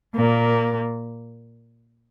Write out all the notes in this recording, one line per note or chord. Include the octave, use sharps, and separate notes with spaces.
A#2 A#3